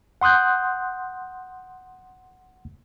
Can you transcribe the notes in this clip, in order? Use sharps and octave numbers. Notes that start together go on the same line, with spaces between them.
F#5 C6 D#6 F#6 G6